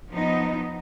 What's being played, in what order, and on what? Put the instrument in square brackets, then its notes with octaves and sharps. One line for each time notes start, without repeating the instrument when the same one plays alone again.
[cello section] F3 B3 D#4